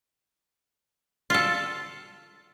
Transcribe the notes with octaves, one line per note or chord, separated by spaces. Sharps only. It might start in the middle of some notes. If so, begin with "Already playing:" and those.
F4 A4